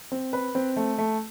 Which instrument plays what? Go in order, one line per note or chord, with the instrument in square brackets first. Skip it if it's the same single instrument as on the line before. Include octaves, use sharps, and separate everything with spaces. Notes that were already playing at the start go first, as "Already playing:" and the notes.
[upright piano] C4
B4
C4
A3
A3